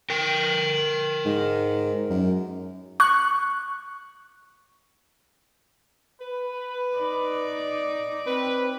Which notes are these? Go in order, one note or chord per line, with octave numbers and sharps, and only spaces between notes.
A#4 G5
G#2
F#2
C#6 F#6
B4
D#4 D5
C4 B4